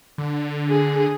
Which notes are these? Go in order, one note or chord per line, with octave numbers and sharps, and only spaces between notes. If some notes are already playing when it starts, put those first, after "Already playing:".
D3
G#4